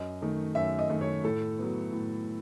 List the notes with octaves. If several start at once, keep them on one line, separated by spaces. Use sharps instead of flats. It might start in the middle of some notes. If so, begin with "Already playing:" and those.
Already playing: F#2 D#5
D#3 A3
F#2 E5
D#5
D#3 A3 D#5
C#5
A2 A4
F#3 B3
A2